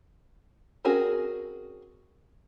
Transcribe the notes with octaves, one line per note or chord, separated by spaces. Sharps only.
C4 C#4 F#4 G#4 A#4